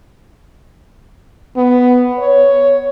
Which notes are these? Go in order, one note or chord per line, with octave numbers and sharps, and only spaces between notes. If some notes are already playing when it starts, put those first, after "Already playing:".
B3
C#5